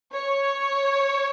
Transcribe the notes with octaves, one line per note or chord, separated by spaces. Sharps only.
C#5